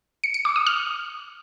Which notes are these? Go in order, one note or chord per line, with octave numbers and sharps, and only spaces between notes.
C#7
C#7
D6
D#6
F6